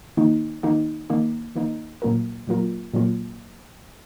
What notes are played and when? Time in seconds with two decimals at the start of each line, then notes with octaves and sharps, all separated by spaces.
0.17 D#3 A#3 D#4
0.63 D#3 A#3 D#4
1.10 D#3 A#3 D#4
1.56 D#3 A#3 D#4
2.02 A#2 F#3 A#3 F4 A#4
2.47 A#2 F#3 A#3 F4 A#4
2.94 A#2 F#3 A#3 F4